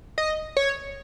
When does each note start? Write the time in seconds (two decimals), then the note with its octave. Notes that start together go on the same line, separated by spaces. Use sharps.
0.18 D#5
0.57 C#5